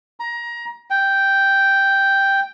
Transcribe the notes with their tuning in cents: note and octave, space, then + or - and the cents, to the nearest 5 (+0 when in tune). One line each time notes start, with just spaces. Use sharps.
A#5 +25
G5 +0